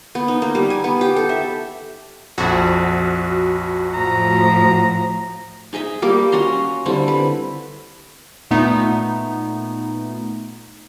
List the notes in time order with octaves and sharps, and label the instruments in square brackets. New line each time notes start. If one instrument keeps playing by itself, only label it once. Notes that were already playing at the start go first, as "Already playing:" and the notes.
[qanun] B3
D#4
A#3
G3
G#5
B3
G4
A4
E5
[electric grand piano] A#1 F2 [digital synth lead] F#4
[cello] A2 F3 [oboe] A#5
[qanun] D#4 G#4 D#5 E5
G3 A#3 G4
C#4 F#4 A#5 C6
D3 G3 C4 E4
B4
[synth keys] A#2 A3 B3 D#4